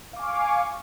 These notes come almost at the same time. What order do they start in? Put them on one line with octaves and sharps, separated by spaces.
F5 D6 G#5 C#6